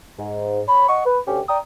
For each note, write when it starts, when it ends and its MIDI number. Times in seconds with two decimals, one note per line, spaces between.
0.19 0.61 44
0.68 0.86 73
0.68 0.86 83
0.88 1.01 75
0.88 1.01 78
0.88 1.01 85
1.06 1.19 71
1.28 1.41 38
1.28 1.41 61
1.28 1.41 67
1.49 1.58 74
1.49 1.58 79
1.49 1.58 82
1.49 1.58 87